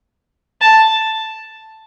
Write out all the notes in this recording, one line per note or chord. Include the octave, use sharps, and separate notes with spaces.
A5